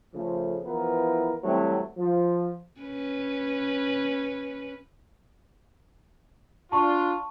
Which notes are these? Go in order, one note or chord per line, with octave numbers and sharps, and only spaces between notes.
C#3 F3 A3
E3 F3 B3 E4 A#4 B4
E3 F#3 G3 A3 C4
F3
C#4 B4
D4 F4 A5 C#6